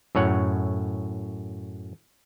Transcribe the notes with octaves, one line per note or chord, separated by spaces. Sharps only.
F#2 A2 C#5 F#5